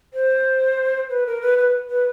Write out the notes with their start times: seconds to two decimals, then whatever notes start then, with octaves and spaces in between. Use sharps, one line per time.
0.14 C5
1.10 B4
1.26 A#4
1.41 B4
1.58 B4
1.90 B4